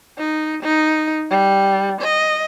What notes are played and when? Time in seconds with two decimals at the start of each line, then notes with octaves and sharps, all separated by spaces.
0.18 D#4
0.63 D#4
1.31 G3
2.01 D#5